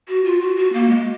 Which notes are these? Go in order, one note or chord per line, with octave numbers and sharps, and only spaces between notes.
F#4
F4
F#4
F#4
A#3
G#3